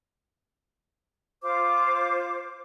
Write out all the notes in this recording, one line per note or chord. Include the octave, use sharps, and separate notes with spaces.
F4 C5 D6